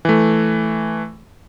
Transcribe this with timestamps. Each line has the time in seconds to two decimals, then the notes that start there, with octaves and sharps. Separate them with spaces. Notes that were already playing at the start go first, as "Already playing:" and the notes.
0.05 E3 A3